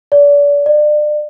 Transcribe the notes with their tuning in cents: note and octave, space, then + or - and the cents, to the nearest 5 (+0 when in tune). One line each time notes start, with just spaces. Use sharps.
D5 -35
D5 +35